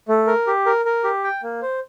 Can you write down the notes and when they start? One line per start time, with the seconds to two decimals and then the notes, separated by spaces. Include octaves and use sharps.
0.09 A3
0.27 A#4
0.47 G4
0.66 A#4
0.85 A#4
1.04 G4
1.24 G5
1.43 A#3
1.62 C5